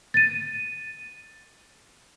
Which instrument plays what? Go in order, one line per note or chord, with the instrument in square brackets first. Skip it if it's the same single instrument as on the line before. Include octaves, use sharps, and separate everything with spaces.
[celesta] A6 D#7